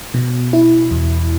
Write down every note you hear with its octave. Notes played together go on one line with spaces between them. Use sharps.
B2
E4
E2